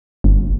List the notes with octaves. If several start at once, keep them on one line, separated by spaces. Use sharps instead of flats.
G1